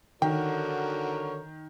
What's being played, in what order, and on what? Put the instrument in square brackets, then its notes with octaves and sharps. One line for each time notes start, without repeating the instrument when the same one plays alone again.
[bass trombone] D3 [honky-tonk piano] D#3 [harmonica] F#4 A#4 C#5 [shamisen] G5